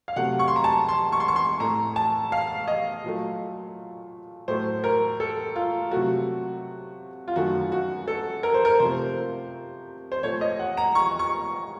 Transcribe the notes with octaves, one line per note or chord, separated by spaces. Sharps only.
F5
C3 F#3 A3 F#5
C#6
C6
A#5
A5
C6
C#6
C6
C#6
C6
A2 A3 A#5
A5
F5
D#5
A#2 F#3 A3
A2 F#3 A3 C5
A#4
A4
F4
C3 F#3 A3 F#4
F4
F#2 D#3 F#3 A3 F#4
F#4
A4
A#4
C5
A#4
C3 F3 A3 C5
C5
A#2 A3 C#5
D#5
F#5
A#5
C#6
C#6